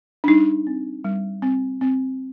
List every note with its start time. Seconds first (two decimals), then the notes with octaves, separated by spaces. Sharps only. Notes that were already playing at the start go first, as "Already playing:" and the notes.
0.24 D4
0.28 G3 D#4
0.67 C4
1.04 G3
1.42 C4
1.81 C4